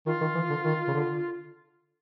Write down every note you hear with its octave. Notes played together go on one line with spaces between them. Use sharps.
D#3 F4
D#3
E3
D3
D#3
C#3
D3